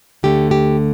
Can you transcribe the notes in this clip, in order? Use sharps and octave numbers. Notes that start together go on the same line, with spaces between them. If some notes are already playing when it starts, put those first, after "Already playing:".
D2 D3 A3 G4
G4